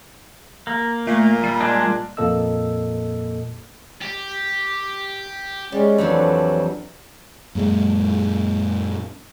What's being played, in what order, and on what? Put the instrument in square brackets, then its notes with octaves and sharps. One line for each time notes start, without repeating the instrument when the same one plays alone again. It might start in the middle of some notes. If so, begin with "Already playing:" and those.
[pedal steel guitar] A#3
[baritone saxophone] A#2 [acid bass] A3
[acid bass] G3
[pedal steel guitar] G#3 D4
[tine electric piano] F2 A#2 A#3 A4 D#5 E6
[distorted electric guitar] G4
[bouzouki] G3 [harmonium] G#3 C#4
[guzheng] F2 A3 D4 [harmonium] E3 F#3
[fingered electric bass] F#2 A#2 G#3